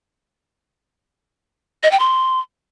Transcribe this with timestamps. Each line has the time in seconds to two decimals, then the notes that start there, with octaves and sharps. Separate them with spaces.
1.83 D#5
1.91 G5
1.99 C6